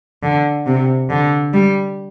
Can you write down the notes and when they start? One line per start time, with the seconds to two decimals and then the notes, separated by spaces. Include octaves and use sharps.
0.23 D3
0.67 C3
1.10 D3
1.54 G3